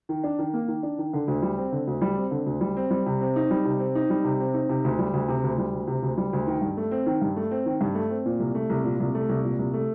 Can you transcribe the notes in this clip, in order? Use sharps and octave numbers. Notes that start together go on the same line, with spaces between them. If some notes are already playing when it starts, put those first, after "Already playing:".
D#3
D4
D#3
A#3
D#3
D4
D#3
D3
D2
G3
C4
D3
D2
G3
C4
D3
D2
G3
C4
G3
C3
C4
D#4
G3
C3
C4
D#4
G3
C3
C4
D#4
C3
D2
G3
D2
C3
D2
G3
D2
C3
D2
G3
D2
D#3
G2
A3
C4
D#3
G2
A3
C4
D#3
G2
A3
C4
A#2
C2
A3
C2
A#2
C2
A3
C2
A#2
C2
A3